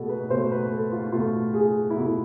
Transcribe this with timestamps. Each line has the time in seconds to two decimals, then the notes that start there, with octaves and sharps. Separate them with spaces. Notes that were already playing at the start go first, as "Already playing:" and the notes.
Already playing: B2 A3 G#4 A4
0.09 B4
0.30 B2 A3 C5
0.51 B4
0.72 A4
0.92 F4
1.12 B2 A3 F4
1.54 G#4
1.90 E4
1.96 B2 A3 F4